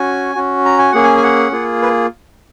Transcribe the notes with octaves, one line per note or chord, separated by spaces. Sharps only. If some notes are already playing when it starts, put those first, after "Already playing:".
Already playing: C#4 F#4 G#5
C#4 F#4
A#5
G#5
A#3 C#4 G#4 F#5
G#5
G#5
F#5
A#3 F4 G#4
B4